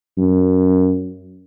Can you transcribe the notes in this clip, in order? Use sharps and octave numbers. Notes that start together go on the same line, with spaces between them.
F#2